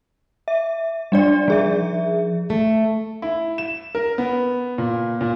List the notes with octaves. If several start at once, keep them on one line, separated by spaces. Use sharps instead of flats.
E5
G3 D4 D5
F3 G#4 E5
A3
E4
E7
A#4
B3
A#2
A#2